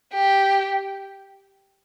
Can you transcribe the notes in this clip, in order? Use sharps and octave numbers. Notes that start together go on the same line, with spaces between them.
G4